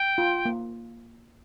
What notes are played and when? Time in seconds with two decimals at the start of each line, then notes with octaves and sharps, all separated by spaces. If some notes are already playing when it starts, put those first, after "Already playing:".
Already playing: G5
0.18 F4
0.45 A#3